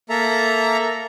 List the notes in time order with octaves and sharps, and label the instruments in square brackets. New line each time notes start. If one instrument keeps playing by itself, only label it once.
[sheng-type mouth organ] A#3 A4 E5 A#5